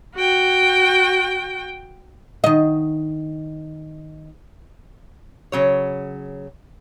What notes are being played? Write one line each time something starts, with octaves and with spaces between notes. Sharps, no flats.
F#4 G5
D#3 D#5
C#3 F#3 C#5